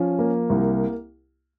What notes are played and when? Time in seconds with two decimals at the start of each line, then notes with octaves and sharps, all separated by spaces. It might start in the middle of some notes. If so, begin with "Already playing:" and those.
Already playing: F3 C#4
0.19 A#3
0.50 C2